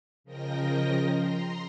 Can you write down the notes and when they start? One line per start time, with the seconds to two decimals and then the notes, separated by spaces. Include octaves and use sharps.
0.24 C#3 F3 A#4 D#5 G5 A#6
1.11 A#5 C6